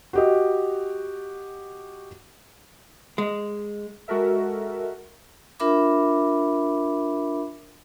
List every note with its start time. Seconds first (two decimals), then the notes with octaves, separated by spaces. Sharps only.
0.13 F#4 G4 D#5
3.18 G#3
4.08 G#3 F#4 A4 A#4 E5
5.60 D4 F4 A#4 E5 B5 D6